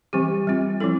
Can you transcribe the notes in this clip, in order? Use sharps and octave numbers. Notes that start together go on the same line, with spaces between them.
E3 G3 C4 G4
G3 C4 F4
F3 C4 E4 A4